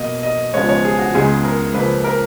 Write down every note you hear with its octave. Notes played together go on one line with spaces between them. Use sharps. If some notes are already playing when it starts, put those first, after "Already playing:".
Already playing: B2 A#3 D#5
D#5
C#2 C#3 F3 G#3 B3 C#5
C#5
G#4
F#4
C#2 C#3 G#3 B3 G#4
A#4
C#2 C#3 F3 A#3 B4
A#4